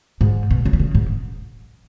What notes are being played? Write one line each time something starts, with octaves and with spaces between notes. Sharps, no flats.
G#2
B2
C#3
E3
C#3
G#2